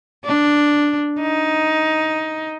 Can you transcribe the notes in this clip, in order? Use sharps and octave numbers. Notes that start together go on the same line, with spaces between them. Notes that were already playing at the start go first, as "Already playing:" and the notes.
D4
D#4